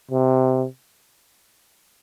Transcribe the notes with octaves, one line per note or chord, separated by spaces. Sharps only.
C3